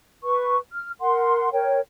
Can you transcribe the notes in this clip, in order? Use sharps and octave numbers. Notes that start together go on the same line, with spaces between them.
B4 C#6
F6
A#4 F#5 C6
A#4 C#5 G5